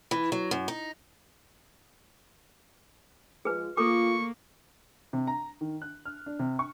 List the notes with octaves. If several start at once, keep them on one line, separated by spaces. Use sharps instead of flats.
E3
F#3
F#2
D#4
F3 G#3 F4 G#4 B4
A#3 F4 A4 C#6 D6
C3
A#5
D#3
F#6
F6
D4
C3
C#6